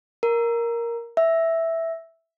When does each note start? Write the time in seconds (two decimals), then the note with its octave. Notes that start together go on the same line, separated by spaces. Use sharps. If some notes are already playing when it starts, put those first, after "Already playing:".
0.23 A#4
1.17 E5